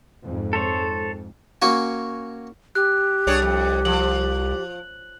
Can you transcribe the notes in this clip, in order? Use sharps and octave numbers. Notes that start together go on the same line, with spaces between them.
F2 G#2
A4 C5 C#5
A#3 C#4 F#4 G#5
G4 F#6
C2 D4 G#4 C#5
F2
F3 F#7